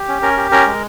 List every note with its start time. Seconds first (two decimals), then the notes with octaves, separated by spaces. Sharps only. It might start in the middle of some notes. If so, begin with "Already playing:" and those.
Already playing: G4
0.08 C#4
0.22 C#4 A#4
0.37 G4
0.51 C#4 A#4
0.67 G#3